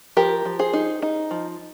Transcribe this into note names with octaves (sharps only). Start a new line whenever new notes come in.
F3 G4 A#4
F3
G#4 C5
D#4
D#4
F3